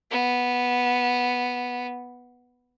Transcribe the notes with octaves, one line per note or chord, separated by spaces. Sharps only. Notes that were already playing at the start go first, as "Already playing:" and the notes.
B3